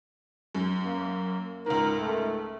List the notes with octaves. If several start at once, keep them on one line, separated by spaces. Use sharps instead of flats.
F#2
A#3
C#2 G#2 A#4
A3